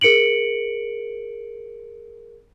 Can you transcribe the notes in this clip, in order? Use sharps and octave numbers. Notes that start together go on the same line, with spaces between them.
G#4 A#4 C#7 D7 F#7